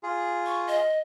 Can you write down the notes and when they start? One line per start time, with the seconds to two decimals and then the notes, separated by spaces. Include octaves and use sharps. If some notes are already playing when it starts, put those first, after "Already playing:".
0.03 F4 G#4
0.46 C#6
0.67 D#5